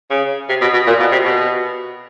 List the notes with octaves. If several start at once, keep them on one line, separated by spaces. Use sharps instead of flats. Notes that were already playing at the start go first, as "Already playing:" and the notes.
C#3
C3
B2
B2
A#2
B2
C3
B2